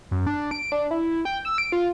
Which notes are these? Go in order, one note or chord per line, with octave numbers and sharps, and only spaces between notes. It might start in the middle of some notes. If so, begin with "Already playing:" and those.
F#2
D4
D7
D4
E4
G5
E6
D7
F4